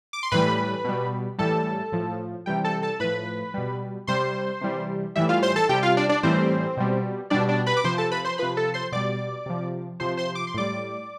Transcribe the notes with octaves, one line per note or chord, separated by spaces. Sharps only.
D6
C6
A2 E3 G3 B4 B5
B2 G3
A2 E3 G3 A4 A5
A2 F3
C3 E3 G3 G4 G5
A4 A5
A4 A5
A2 F3 B4 B5
B2 G3
C3 G3 C5 C6
C3 E3 G3
A2 E3 G3 E4 E5
F4 F5
C5 C6
A4 A5
C3 G3 G4 G5
F4 F5
D4 D5
D4 D5
A2 E3 G3 C4 C5
B2 G3
B2 G3 D4 D5
D4 D5
B4 B5
D6
C3 F3 C5 C6
A4 A5
B4 B5
C5 C6
C3 F3 B4 B5
A4 A5
C5 C6
B2 G3 D5 D6
C3 F3
C3 F3 C5 C6
C5 C6
D6
C6
A2 G3 D5 D6